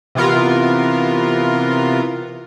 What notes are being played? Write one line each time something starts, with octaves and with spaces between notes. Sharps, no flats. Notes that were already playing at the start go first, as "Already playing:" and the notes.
C3 E3 B3 F4 A#4